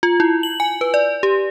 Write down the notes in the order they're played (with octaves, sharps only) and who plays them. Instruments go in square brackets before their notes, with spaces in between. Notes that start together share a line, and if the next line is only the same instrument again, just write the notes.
[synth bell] F4
E4
F#7
G#5
B4
D5
G4